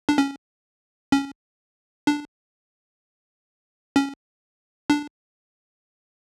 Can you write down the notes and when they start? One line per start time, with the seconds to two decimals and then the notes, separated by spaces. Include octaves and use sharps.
0.09 D4
0.18 C#4
1.12 C#4
2.07 D4
3.96 C#4
4.90 D4